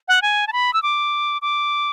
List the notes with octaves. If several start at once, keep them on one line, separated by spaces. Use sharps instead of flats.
F#5
G#5
A5
B5
E6
D6
D6